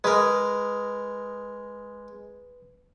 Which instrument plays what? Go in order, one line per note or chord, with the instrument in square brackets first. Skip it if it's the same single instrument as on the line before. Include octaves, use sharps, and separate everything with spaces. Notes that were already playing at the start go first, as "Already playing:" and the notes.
[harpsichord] G#3 A#4 [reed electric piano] B4 D#6